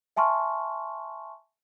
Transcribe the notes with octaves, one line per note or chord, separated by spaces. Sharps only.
E5 G#5 A5 C6 C#6 F6